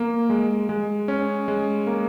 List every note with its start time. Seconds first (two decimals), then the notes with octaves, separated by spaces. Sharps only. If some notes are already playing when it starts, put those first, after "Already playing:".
Already playing: A#3
0.30 G#3
0.69 G#3
1.08 C#4
1.48 G#3
1.87 A#3